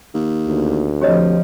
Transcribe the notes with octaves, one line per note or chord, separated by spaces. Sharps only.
D#2
D2
C3 F3 G4 C#5 D#5